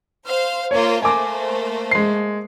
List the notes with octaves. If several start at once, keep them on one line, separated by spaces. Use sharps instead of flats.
C5 F5
A#3 F4 C5 C#5
A3 A#3 C5 G#5 D6
G#3 C7